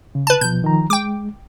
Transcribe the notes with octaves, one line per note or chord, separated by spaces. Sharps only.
C#3
B4 A5
B2 F3 G6
D#3 F3 A#5
G#3 G5 D6